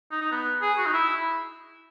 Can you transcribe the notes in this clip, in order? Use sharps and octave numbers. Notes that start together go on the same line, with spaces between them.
D#4
D#4
B3
G#4
F#4
D#4
E4